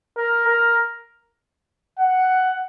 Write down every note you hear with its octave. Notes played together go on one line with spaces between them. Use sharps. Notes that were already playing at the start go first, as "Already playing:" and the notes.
A#4
A#4
F#5